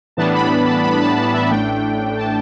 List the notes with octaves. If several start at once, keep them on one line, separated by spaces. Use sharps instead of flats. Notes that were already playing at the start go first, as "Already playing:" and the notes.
A2 E3 G3 B3 D4 A5
B5
A5
B5
A5
A5
E5
A1 A2 A3 D4 G5
A5